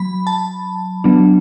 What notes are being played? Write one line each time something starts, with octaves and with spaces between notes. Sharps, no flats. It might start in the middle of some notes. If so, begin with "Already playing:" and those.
Already playing: F#3 B5
A5
F#3 B3 D4